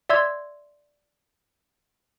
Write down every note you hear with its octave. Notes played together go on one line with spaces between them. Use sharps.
D5 E5 C6 E6 G#6